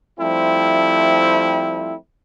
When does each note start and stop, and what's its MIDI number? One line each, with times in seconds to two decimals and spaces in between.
0.20 1.95 53
0.20 1.95 55
0.20 1.95 57
0.20 1.95 60
0.20 1.95 64